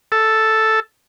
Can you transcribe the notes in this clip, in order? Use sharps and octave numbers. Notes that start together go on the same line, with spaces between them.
A4